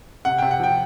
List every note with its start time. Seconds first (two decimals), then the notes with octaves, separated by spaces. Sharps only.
0.25 C3 F#5
0.38 C3 G5
0.51 F#5
0.60 F3 G5